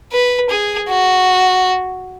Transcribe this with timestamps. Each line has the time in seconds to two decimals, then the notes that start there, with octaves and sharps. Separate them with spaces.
0.12 B4
0.50 G#4
0.89 F#4